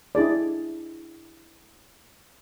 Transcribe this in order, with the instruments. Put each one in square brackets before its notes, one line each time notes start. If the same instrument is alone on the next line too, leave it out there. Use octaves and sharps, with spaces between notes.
[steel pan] D4 E4 G#4 D5